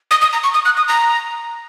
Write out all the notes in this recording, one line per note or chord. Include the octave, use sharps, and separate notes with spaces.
D#6
D#6
A#5
C#6
D#6
F#6
D#6
A#5